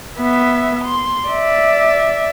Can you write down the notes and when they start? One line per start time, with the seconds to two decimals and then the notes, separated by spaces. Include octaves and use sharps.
0.19 B3 E5
0.84 C6
1.29 D5 E5